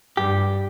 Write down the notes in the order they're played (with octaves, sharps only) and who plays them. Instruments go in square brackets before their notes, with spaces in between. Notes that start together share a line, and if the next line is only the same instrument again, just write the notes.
[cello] G2 [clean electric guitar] G4